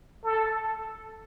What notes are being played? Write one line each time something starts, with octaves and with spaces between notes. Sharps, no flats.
A4